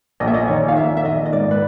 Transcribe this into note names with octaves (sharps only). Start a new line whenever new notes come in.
A#1 D#5
E5
D#5
D#3 C#5
F5
A#1 E5
E5
D#3 D#5
D#5
G#2 D5
B4